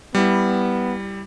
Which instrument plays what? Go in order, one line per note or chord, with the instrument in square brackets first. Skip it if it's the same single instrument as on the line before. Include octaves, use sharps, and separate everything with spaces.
[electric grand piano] G3 E4 [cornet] B3